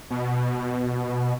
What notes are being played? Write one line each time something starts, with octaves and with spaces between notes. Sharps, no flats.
B2